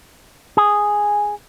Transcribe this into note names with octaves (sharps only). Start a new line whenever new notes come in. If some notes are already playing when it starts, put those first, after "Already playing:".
G#4